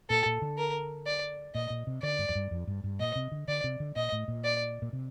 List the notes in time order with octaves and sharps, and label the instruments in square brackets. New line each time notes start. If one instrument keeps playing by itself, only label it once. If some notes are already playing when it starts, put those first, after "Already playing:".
[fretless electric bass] A#2 [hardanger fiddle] A4
[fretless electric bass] A#2
D3
[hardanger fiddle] A#4
D5
[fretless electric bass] A#2 [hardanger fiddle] D#5
[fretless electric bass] A#2
C3
[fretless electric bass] D3 [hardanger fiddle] D5
[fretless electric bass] G2
F2
G2
F2
G2
G2
[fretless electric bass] A#2 [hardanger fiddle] D#5
[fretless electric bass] C3
D3
[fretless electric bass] D3 [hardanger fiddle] D5
[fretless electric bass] C3
D3
[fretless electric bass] A#2 [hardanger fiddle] D#5
[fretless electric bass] A2
A#2
[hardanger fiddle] D5
[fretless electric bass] A#2
C3